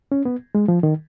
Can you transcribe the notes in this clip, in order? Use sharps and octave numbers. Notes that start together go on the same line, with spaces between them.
C#4
B3
G#3
F3
D#3